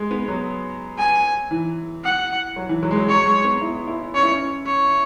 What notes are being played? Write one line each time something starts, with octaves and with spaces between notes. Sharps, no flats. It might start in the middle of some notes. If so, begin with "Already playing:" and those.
Already playing: G#3
B3
F#3
G#5
E3
F#5
F#3
E3
F#3
G#3
F#3
F#3 C#5
G#3
B3
E4
E4
C#4 C#5
E4
C#4
C#5